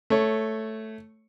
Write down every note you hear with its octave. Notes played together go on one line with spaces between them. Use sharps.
A3 C#5